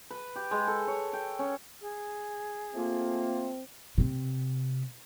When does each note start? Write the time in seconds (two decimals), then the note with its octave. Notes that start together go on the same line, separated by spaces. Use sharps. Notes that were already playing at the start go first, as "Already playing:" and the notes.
0.11 B4
0.36 G4
0.51 G#3
0.67 A4
0.88 C#5
1.13 G5
1.39 C#4
1.81 G#4
2.75 A3 A#3 C4 F4
3.98 C3 C4